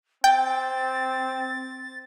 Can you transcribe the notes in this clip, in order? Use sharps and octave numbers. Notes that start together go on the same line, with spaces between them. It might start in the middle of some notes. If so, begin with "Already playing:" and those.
C4 G5 A6